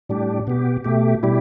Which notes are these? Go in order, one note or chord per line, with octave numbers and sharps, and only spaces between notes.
A2 G3 D4 G4
B2 B3 G4
B2 A3 G4
B2 G3 E4 G4